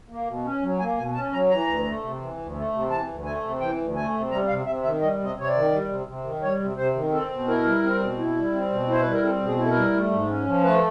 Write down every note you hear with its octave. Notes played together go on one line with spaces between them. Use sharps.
A#3
B2
C#4
F#3
A#3 G#5
B2 G#5
C#4 A5
F#3 A#5
E3 A#5
D2
A3
C3
E3
D2
A3
C3
E3 A5
D2
A3 G#5
C3
E3 G5
D2
A3 G#5
C3
G3 A#5
C3 F5
C3 E5
D#3 E5
G3 D#5
C3
D#5
C3 C#5
D5
D#3
G3
C3
C3
D#3
G3 C#5
C3
C3 C5
D#3
C4 A4
B2
E4 A#4
G3
C4
B2
E4
G3
C4
B2
E4 C5
G3 B4
A#4
C4 A4
B2
G#4
E4
A4
A#4
G3
A3
G#2
C#4
F3
A3 B4